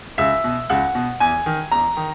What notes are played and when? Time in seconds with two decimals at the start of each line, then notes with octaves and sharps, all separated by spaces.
0.18 C#2 E5
0.44 B2
0.70 C#2 F#5
0.95 B2
1.20 E2 G#5
1.46 D#3
1.71 E2 A#5
1.97 D#3